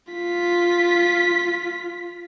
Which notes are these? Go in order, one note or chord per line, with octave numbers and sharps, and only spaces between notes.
F4 B6